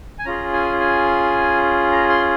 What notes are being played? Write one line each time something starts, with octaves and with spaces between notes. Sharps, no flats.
G#5
C#4 F4 G#4 A#5
G#5
G#5
A#5
C6